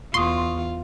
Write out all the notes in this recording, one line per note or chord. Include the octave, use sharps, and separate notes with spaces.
E2 F4 C6 C#6 D#6